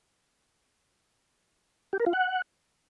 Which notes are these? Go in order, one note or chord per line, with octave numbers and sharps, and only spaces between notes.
G4
A#4
F4
F#5